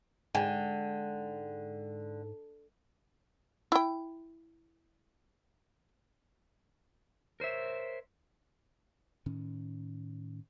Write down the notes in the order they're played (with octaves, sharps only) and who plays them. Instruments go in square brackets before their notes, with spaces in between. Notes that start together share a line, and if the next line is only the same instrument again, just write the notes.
[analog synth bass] G#2 [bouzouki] D3 [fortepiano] G5 G#5
[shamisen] E4 G5
[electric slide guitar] A#4 C5 C#5 E5
[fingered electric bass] A2 D#3 C#4